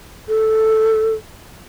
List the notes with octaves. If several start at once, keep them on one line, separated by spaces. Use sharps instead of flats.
A4